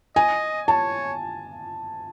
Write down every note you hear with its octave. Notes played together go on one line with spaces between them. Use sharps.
D#5 G#5
C#5 A5